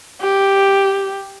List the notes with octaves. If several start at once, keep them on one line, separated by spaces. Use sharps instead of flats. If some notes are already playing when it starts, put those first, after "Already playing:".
G4